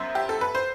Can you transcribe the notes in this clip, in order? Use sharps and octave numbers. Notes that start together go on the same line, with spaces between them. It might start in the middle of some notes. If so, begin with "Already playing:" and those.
Already playing: F#2 F#3 B3 C5 E5
G4
A4
B4
C5